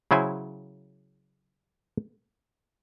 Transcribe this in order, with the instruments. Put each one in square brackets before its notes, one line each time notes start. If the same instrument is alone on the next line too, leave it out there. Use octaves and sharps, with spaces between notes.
[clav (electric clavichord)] C#3 F#3 E4 C5 G#5